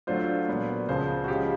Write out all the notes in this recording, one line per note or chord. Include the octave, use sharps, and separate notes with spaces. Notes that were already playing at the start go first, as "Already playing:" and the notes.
D3 F#3 A3 D4 F4 C5
A#2 F#3 B3
C#2 C#3 F3 C5
F#4
C#3 F3 G#3 C#4 G4